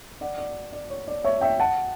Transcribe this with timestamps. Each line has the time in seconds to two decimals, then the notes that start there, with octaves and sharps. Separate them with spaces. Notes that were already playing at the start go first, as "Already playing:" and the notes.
0.21 D5 F#5
0.38 D5
0.73 D5
0.90 C#5
1.08 D5
1.24 C#5 E5
1.41 E5 G5
1.60 F#5 A5